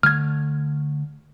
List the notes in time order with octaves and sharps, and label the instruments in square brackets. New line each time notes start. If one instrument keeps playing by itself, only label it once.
[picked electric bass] D3 A3 [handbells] F6 G#6